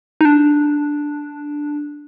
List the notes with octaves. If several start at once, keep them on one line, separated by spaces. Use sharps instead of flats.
D#4
D4